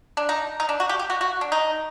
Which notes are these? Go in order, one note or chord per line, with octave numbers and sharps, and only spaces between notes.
D4
D#4
D#4
D4
F#4
G4
G4
F#4
F#4
D4
D#4